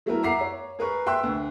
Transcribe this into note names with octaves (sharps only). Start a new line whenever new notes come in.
F#3 A3 B3 E4 A4 A#4
E5 F#5 A#5 D6 C7
C#5
G#4 A#4 B4 C#6
E5 G5 C6 E6 F#6
D2